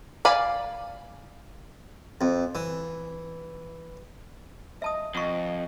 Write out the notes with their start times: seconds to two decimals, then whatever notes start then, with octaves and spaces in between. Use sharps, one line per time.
0.25 D5 F5 G#5 B5
2.21 F2
2.55 E3
4.82 D#5 E5 A5 D#6
5.15 F2 D#5 F#5 C#6